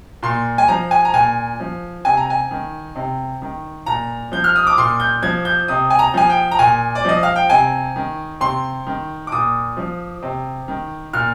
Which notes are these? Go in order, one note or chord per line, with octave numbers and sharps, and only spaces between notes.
A#2 C6
G#5
F3 A#5
G#5
A#5
A#2 G#5
F3
C3 G#5
A#5
G#5
D#3
C3
D#3
A#2 A#5
F3 G6
F6
D#6
D6
A#2 C6
G6
F3 G#6
G6
C3 D#6
G#5
A#5
F3 G#5
G5
A#5
A#2 G#5
D5
F3 D#5
F5
G5
C3 G#5
D#3
C3 C6
D#3
D6
A#2 D#6
F3
C3
D#3
A#2 F6